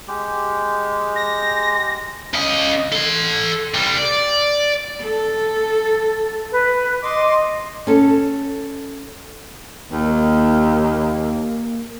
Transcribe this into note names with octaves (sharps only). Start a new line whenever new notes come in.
G#3 G4
A#6
C#3 D#5
A4 C6
C3 G3
D5
A4
B4
D#5 C6 D6
C#4 A4
D#2 A#3